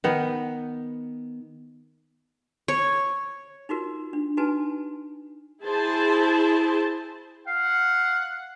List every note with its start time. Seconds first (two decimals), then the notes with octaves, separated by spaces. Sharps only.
0.04 D#3 B3
2.68 C#5
3.69 D#4 F4 F#4 A#4
4.13 D4
4.37 D#4 F#4 B4 G#5 A5
5.64 E4 G#4 C5 A5
7.47 F5 F#5